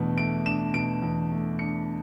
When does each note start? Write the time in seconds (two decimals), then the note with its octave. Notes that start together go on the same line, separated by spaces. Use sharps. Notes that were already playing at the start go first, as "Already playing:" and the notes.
Already playing: E2 B2 A3 D4
0.17 A3 D7
0.45 D4 E7
0.74 B2 D7
1.02 E2
1.31 A3
1.59 D4 C#7